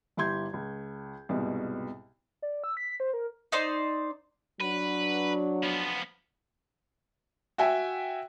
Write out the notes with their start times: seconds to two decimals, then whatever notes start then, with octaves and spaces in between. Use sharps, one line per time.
0.17 G1 E4 G4 C6 G6 G#6
0.54 C#2
1.29 C2 G#2 B2
2.42 D5
2.64 E6
2.77 B6
3.00 C5
3.13 A#4
3.52 D#4 C5 D5
4.60 F#3 D4 B4
5.63 F3 B3
7.58 F#4 E5 G5 G#5